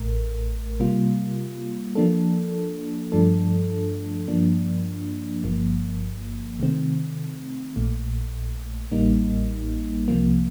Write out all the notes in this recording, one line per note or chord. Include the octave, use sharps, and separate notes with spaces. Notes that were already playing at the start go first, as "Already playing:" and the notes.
Already playing: A1 A2 A3 A#4
C3 G3 A#3 F4
F3 A#3 D4 A4
G2 F3 A3 D4 A4
G2 F3 A#3 D4
G1 G2 F3 A#3
C3 D#3 A3 C4
A#1 A#2 A3
A1 A2 G3 A#3 D#4
C2 C3 F3 A#3